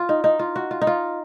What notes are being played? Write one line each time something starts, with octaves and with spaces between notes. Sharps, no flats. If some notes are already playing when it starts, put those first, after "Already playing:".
Already playing: F4
D#4
D#4
F4
F#4
F4
D#4
F4